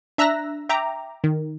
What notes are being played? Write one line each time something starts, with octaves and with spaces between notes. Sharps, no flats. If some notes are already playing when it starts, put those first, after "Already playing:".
D4 E5 A#5 E6 F#6 A#6
E5 G5 A#5 D6
D#3